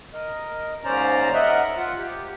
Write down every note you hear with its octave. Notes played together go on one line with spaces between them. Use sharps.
A#4 D#5
D#2 G#2 C#4 C5 D5 A#5
A#4 D#5 E5 F#5 F#6
F4 F#5
G4